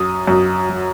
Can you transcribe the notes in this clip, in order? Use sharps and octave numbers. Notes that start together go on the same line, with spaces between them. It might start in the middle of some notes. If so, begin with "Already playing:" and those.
Already playing: F#2 D#6
F#2
F#3